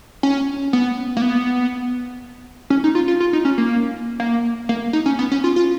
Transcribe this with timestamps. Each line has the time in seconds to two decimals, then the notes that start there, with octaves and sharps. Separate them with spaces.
0.23 C#4
0.73 B3
1.17 A#3
1.22 B3
2.70 C#4
2.84 D#4
2.95 F4
3.08 F4
3.20 F4
3.33 D#4
3.45 C#4
3.58 A#3
4.20 A#3
4.69 A#3
4.93 D#4
5.06 C#4
5.19 B3
5.31 C#4
5.44 F4
5.56 F4